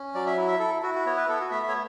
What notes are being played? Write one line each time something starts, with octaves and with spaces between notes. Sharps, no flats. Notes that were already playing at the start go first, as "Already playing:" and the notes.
Already playing: C#4
F#3 D5
E5
E4
E5
E4 A4
E4 F#4
F#4
B3 C#5
B4
B3 A4
F#4
A3 E5
E5
C#5